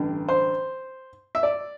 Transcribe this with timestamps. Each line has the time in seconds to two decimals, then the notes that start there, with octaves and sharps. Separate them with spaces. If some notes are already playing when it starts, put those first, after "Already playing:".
Already playing: A1 G2 D3
0.29 C5
1.35 E5
1.43 D5